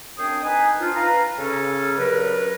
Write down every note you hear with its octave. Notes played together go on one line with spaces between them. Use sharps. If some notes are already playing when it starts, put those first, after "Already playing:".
F#2 C4 D4 G#4 G5 D#6
D#4 B4 G#5
F3 D4 D#4 F4
B4 F5 A#5
C#3 C#4 A4
G2 F#3 A#4 B4